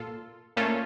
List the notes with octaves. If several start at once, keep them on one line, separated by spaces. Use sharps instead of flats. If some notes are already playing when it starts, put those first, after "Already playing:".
Already playing: A#2 F4 A4
A#2 A3 C#4 F4 A4